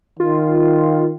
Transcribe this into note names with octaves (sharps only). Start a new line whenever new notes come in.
D#3 F4